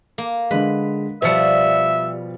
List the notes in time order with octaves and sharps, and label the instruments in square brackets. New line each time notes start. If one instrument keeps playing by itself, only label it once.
[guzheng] A#3
[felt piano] D3 G#3 [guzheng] B4
[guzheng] B2 F3 G3 [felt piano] C5 C#7 [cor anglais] E5